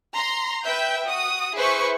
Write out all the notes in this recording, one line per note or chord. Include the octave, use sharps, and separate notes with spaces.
A#5 C6
B4 E5 G5 G6
F#4 D#6
E4 G#4 B4 C5 E5 C#6